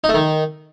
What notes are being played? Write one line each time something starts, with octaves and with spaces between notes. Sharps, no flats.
D#4
A3
D#3